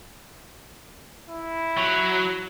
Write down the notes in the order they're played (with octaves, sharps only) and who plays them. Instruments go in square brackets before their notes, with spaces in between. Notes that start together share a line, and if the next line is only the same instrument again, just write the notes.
[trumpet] E4
[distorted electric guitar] F#3